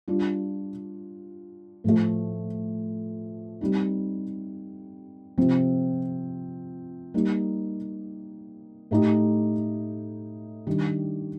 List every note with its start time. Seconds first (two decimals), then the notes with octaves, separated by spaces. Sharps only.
0.08 G3 D4 F4
1.84 A2 F3 A3
3.61 G3 C4 D#4
5.38 C3 F3 C4
7.14 G3 A#3 D#4
8.91 A2 A3 D#4 G4
10.67 D#3 G3 D4 G4